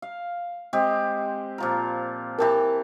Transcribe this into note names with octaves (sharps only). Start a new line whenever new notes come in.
F5
G#3 C4 G4
A#2 F3 A#4
E3 G4 A#4 A5